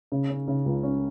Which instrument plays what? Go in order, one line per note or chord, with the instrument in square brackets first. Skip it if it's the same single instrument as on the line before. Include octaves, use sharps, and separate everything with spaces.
[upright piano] C#3
C#4
C#3
C#2
C#4